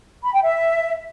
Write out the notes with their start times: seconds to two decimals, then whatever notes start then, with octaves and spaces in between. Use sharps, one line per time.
0.24 B5
0.33 G5
0.43 E5